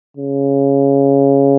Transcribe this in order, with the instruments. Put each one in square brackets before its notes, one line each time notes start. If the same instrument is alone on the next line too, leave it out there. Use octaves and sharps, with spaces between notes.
[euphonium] C#3